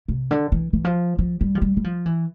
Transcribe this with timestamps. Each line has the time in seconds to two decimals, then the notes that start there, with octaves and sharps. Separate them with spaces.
0.08 C3
0.31 D3
0.52 E3
0.73 E3
0.85 F3
1.19 F3
1.41 G3
1.55 F3
1.62 G3
1.77 G3
1.84 F3
2.06 E3